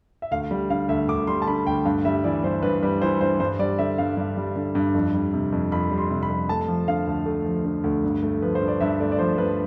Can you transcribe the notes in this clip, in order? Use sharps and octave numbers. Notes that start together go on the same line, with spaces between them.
E5
D2 F5
G3
D3 F5
D2 E5
D2 D6
G3 C6
A5
D3 B5
D2 G5
G2 F5
G3 E5
E3 D5
G2 C5
G2 B4
G3 B4
E3 C5
G2 C5
G2 C5
G3 D5
D3 E5
G2 F5
G2
G3
D3
G2
F2
G3
C3
F2
F2 B5
G3
C6
C3
B5
F2
A3 A5
F3
D3 F5
D2
A3
F3
D3
D2
G2
A3
F3 B4
C5
G2
D5
G2 E5
A3 D5
D5
F3 C5
G2 B4